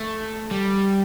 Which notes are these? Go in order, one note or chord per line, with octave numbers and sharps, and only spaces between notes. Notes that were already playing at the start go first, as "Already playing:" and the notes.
Already playing: A3
G3